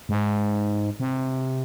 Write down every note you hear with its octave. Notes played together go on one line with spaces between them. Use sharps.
G#2
C3